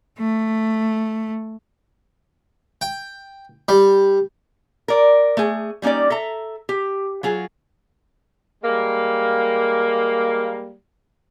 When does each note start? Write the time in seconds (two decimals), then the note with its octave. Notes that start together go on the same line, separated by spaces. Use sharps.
0.19 A3
2.81 G5
3.68 G3
4.88 A#4 D5
5.37 A3 G#4
5.82 G3 A#3 C#4 D#4 D5
6.10 A4 E5 A#5
6.69 G4
7.23 F#3 F4 G#4
8.63 G3 G#3 A#3